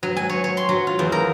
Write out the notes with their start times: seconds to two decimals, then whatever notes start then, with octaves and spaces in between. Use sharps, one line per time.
0.03 F#3
0.17 G#5
0.29 C#5
0.44 C#5
0.57 C6
0.69 F#3
0.87 F4
0.99 E2
1.12 A#4